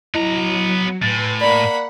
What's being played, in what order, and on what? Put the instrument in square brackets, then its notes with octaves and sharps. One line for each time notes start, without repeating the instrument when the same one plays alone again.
[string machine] F#3 [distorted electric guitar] B3 A#5 [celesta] E4 D#5
[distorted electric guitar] A2 [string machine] B4 G#5 C6 [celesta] A6
[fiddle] A#3 B5 [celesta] D5 [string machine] F#5